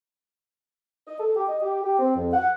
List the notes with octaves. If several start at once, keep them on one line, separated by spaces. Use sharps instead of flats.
D#5
A4
G4
D#5
G4
G4
C4
F2
F#5